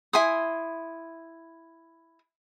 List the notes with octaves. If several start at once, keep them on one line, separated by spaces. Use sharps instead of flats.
E4 G#5 C6 D#6